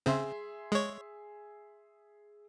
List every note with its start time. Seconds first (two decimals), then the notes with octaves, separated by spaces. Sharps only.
0.06 C#3 C4 G#4 E5 C6
0.72 G#3 C#5